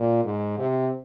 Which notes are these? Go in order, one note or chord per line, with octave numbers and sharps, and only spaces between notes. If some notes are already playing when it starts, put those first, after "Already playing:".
Already playing: A#2
G#2
C3